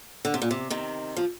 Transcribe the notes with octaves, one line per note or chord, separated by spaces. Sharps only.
D3
C3
A#2
C3
C3 D#3
F3